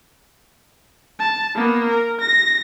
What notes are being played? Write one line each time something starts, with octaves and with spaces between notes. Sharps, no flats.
A5
A#3 B3
A#4
A#6